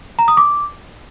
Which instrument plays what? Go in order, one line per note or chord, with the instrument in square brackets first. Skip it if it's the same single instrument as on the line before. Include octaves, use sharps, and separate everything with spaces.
[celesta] A#5
D#6
D6